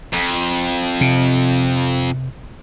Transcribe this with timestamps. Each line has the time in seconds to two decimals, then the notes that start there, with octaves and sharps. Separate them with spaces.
0.13 F2
1.01 C3